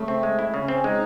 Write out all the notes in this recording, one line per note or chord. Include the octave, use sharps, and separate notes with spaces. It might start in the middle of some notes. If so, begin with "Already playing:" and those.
Already playing: C#3 A3
C4
G#3
E4
C#3 C#4
C4
G#3 D#4